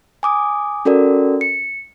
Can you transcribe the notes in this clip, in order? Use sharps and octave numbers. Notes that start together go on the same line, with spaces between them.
G#5 D6 D#6
C#4 F#4 A4 A#4 D5
C#7